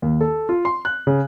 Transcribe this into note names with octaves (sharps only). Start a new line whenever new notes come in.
D#2
A4
F4
C6
F#6
C#3